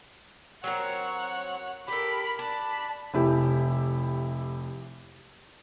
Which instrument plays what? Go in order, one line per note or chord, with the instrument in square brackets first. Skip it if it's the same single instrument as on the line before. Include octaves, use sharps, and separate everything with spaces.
[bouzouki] F#3 C4 A#4 [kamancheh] C#5 F#5
[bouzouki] G4 A4 [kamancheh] A#4 B5
[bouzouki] D4 [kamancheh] A5 B5
[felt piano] F1 E4 G4